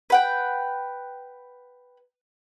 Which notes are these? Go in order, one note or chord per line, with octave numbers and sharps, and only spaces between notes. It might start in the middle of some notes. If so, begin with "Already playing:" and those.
B4 F#5 G5